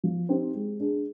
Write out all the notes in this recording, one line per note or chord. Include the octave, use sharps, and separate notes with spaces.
F3
C4 D#4 G4 C5
G#3
D4 G#4